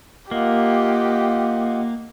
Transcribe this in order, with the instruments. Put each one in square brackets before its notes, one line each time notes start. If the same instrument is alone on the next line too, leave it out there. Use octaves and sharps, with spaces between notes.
[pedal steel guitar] A#3 [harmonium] F4 D#5 F#5 [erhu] G4